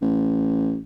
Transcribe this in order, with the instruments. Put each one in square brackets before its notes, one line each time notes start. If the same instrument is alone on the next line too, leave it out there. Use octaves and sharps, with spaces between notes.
[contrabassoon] A1